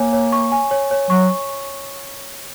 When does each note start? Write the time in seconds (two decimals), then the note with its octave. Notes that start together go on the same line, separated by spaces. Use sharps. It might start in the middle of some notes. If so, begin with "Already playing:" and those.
Already playing: A#3 C#5 G#5
0.13 C#5
0.32 C#6
0.52 G#5
0.71 C#5
0.91 C#5
1.10 F#3 C#6